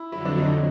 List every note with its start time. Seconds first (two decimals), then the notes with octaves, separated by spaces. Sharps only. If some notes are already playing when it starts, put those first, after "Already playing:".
Already playing: E4
0.12 F2 D3 F#3 E4
0.25 D4
0.38 D#4